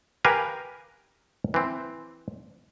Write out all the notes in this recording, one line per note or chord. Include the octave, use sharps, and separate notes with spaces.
G4 A#4 B4 F5 G#5
E3 C4